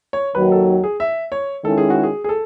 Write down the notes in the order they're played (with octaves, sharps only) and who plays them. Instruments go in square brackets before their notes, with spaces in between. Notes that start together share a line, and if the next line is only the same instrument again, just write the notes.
[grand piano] C#5
[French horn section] D#2 D#3 F#3 [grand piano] B4
[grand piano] A4
G#4
E5
C#5
[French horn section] D#3 G#3 C#4 E4 [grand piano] A4
[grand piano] G#4
F#4
G#4
G#4
A4